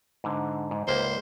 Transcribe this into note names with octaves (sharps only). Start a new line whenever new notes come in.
G#2 D3
G#2
C#2 A#3 C5 E5